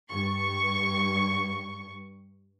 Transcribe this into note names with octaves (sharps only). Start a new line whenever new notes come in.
G2 C#6